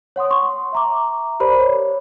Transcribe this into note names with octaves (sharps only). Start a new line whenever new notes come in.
C#5 F#5 C6 D#6
C6 C#6
E5 A#5 D6
G4 A#4 C5 D5 B5
C#5